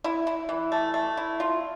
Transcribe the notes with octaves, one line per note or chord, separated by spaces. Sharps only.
E4
E4
E3
A3
A3
E4
F4